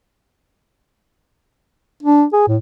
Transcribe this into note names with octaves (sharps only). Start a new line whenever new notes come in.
D4
G#4
A2